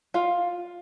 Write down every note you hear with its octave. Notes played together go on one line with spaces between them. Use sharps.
F4 F5